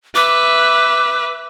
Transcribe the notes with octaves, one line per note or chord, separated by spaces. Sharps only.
B4 E5 D6